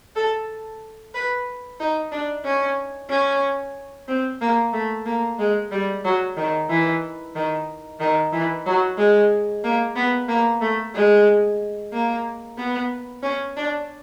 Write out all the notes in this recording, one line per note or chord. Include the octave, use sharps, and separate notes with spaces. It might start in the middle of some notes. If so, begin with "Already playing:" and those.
A4
B4
D#4
D4
C#4
C#4
C4
A#3
A3
A#3
G#3
G3
F#3
D#3
E3
D#3
D#3
E3
F#3
G#3
A#3
B3
A#3
A3
G#3
A#3
B3
C#4
D4